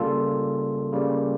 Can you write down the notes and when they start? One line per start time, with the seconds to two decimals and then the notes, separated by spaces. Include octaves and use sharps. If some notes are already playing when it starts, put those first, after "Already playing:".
Already playing: C#3 G3 A#3 F4 A4
0.92 C#3 G3 A#3